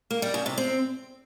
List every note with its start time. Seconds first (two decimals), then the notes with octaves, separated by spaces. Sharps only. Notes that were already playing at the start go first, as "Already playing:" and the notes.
0.11 A#3
0.22 G3
0.34 C#3
0.46 C3
0.58 C4